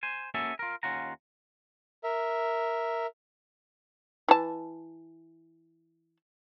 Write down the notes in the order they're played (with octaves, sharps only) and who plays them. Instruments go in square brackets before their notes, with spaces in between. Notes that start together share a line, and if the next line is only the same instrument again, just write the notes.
[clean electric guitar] C5 G#5
A#3 C#4 F#4 G#4 A4 E5
F4 A#4
D#2 C#4 F4 F#5 A#5
[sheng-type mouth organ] A#4 E5
[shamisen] E3 A5